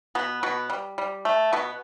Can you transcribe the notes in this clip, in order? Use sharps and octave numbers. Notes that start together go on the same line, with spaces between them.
B2 B3
B2 B3
G3
G3
A3
B2 B3